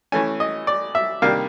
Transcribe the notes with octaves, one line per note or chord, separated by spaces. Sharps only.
E3 A3 C#4 G#5
D#5
D5
E5
C3 D#3 G3 A#3 D4 F5